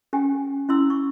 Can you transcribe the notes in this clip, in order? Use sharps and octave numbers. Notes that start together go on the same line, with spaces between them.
C#4 G4 G5 G#5
C#4 E4 C6 E6
C#6